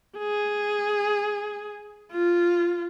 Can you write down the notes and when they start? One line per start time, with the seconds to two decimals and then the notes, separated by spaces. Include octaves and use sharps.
0.18 G#4
2.12 F4